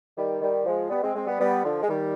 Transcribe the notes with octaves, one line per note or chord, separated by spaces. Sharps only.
D#3 G3
D#3 G3
F3 G#3
G3 B3
G#3 C4
G#3 C4
G3 B3
G3 B3
D3 F3
G#3
D#3 G3